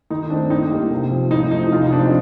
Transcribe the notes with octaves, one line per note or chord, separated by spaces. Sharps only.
D#3 D#4
A3 C4 D4
A2 D#4
G3 A#3
C3
F3 C4
A2 D#4
F3 A3 C4 D#4
C3 F4
D#4
F3 A3 C4 D4
D#4